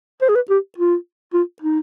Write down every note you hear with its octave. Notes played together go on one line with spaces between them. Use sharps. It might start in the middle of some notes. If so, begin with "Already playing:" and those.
C5
G#4
B4
G4
F4
F4
D#4